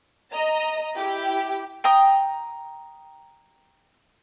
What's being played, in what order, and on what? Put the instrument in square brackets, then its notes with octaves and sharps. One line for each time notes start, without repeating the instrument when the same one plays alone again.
[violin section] D#5 A#5
E4 G4
[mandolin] G5 A#5 D#6